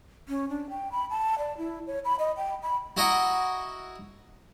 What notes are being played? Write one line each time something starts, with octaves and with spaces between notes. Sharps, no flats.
C#4
D4
G5
B5
A5
D5
E4
C#5
B5
D#5
G5
B5
E4 F#4 D#5 F#5 A#5